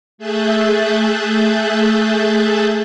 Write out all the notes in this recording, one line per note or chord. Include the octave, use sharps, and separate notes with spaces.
A3 G#4 E5 F#6 G6 A6